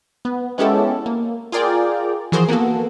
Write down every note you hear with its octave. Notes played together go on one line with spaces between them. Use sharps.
B3
G#3 B3 C#4 E4 G4 A4
A#3
F4 G#4 A#4 D5 G5
E3 F3 F#4 G#4 A#4 C5
A#3 B3 F#4 A4